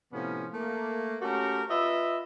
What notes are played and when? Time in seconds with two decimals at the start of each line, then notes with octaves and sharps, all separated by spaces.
0.12 A2 C3 F3 B3 C#4
0.53 A3 A#3
1.21 A3 C#4 F#4 G4 A#4
1.69 F4 B4 D#5 E5